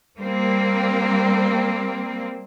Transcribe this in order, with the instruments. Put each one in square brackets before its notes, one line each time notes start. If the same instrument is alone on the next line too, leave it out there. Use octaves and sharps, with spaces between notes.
[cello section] G3 A#3 C4